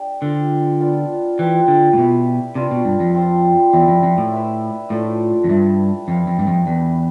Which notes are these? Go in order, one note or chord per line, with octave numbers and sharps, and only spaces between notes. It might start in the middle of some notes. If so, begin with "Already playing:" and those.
Already playing: D4 G4
D3 C4 F4 C5
B3 D4 F4 B4
E3 F3 C4 G4 C5
D3
A2
B2 E4 G4 B4
C3 D4 F4 B4
B2
G2
F2
C4 F4 C5
E2 E4 G4 D5 F5
F2
F2
A2
E4 B4 E5
A2 F3 A3 D4 A4
F2
G2 A3 E4 B4 E5
F2 C4 E4 B4 F5
F2
G2
F2
E2 D4 G4 B4 E5